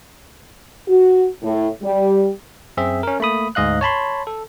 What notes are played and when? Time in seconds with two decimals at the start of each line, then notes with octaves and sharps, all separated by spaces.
0.88 F#4
1.43 A2
1.83 G3
2.77 F#2 C4 G#4 E5
3.03 C#4 A#4
3.20 A3 A#3 B5 D#6
3.55 D2 G#2 D#5 F5 F#6
3.81 C#5 A5 B5 C6
4.27 A4